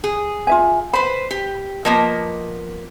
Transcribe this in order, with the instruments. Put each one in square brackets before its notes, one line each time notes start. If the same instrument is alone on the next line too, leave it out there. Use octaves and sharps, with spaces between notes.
[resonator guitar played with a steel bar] G#4
[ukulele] F4 E5 G#5
[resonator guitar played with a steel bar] B4 C5 [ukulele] B5
[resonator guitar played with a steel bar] G4
[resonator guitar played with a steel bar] F3 A#3 B3 [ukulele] D#5